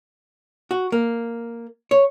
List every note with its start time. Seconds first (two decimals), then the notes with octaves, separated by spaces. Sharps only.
0.71 F#4
0.92 A#3
1.91 C#5